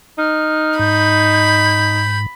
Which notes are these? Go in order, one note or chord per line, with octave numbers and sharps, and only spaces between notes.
D#4 F6
G#2 B5 G6